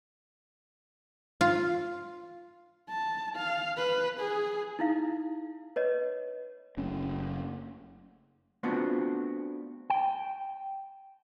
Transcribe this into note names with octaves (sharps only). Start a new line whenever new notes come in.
F4
A5
F5
B4
G#4
D#4 E4 F5
B4 C#5 D#5
F#1 A3 C#4
A3 B3 C4 D4 F4 F#4
G5